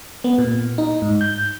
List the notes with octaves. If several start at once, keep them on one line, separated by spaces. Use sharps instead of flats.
B3
A#2
D#4
G#2
G6